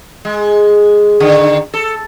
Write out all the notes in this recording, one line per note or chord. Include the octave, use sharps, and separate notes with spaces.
G#3
D3 D#3
A4